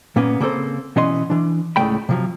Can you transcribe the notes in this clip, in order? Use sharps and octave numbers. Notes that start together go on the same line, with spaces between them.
A#2 A#3 B3 C#4
C#3 A#3 C4 A4 C5
B2 E3 C#4 D#5 C6
E3 D4
C#2 A2 C#3 A3 G5 B5
C3 F3 F#3